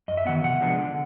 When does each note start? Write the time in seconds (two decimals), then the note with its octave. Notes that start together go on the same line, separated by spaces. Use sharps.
0.08 F#2 D#5
0.17 E5
0.26 D#3 F#3 B3 F#5
0.43 C3 F#5
0.61 F3 G#3 B3 D4
0.78 D3